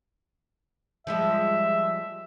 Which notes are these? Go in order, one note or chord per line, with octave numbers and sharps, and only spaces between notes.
F3 G3 G#3 E5